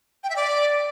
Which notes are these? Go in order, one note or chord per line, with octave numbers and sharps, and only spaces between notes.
G5
E5
D5